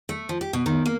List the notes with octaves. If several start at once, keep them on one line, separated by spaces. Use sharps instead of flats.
A3
F3
G4
B2
D#3
A#3